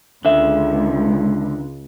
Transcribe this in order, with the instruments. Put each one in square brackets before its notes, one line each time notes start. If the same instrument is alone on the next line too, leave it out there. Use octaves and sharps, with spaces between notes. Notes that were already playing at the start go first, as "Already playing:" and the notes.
[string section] C#2 [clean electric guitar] D3 E5